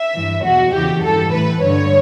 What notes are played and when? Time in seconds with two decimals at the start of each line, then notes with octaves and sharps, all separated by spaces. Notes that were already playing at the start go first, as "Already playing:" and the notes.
Already playing: E5
0.14 G2 E3
0.43 E2 B2 F#4
0.73 E2 C#3 E3 G4
1.03 G2 E3 A4
1.32 A2 E3 B4
1.62 G2 D3 C#5